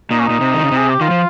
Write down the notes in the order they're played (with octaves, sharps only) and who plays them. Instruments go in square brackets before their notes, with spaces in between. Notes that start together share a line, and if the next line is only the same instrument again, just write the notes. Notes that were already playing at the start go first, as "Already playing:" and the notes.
[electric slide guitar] A#2 [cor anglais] D#4
[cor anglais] C#4
[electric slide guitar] A#2 [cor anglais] D#4
[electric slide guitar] C3
D#3
C#3
C3
[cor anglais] G#4
G4
[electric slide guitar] D#3 [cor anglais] F4
[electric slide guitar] F3